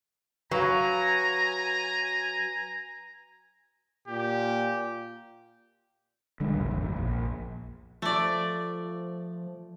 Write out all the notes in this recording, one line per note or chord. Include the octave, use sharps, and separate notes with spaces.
F#3 B4 F5 G#5 A#5
A#2 G4
D3 G3 G#3 D4
A#1 D#2
G#1 F2
A#1
F3 A3 D5